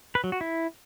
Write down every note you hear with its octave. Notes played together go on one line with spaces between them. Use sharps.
B4
F#3
F#4
E4